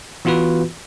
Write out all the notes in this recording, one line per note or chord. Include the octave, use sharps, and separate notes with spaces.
E3 B3 F4 F#4 B4